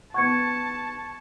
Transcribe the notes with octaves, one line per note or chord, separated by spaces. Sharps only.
B3 F#5 A5 C#6 G#6 C#7